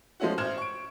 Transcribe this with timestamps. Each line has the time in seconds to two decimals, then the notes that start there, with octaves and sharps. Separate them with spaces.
0.20 F3 G#3 A3 C#4 E4 F#4
0.38 A1 C5 C6 F6 G#6 E7
0.58 C#6 D7